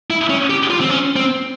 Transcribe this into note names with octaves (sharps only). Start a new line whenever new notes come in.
E4
C#4
G4
F4
C4
C#4
C4